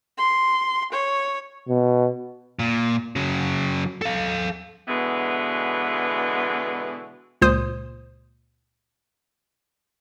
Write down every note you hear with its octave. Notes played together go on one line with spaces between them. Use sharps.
C6
C#5
B2
A#2
C#3 F#3
A4 F5
B2 D3 E3 G#3 B3
C#2 A#2 C5 D#6